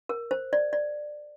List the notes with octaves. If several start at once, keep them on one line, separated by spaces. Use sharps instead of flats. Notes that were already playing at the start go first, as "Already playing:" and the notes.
A#4
C5
D5
D5